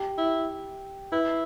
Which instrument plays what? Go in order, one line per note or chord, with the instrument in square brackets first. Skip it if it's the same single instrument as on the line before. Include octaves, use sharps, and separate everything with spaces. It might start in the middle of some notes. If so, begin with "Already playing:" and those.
Already playing: [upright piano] G4
[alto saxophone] E4
[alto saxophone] E4 [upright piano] B4